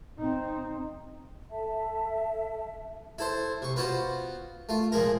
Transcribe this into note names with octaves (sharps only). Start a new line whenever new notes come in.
C4 D#4
A4 E5 A5
E4 A4 C5
C3 C#6
B3 F4 F#4 C5
A3 F4
A#2 F3 G#3 A#4